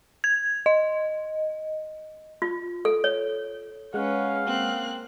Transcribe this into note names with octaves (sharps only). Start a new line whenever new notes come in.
G#6
D#5
F4
A4
C#5
G#3 C#4 B4 F5 F#5
A#3 C4 F#6